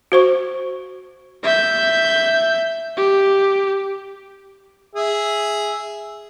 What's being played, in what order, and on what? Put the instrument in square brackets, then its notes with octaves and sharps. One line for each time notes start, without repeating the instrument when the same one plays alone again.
[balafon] F#4 C5 C#6
[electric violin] E5 G6
G4
[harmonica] G#4 E5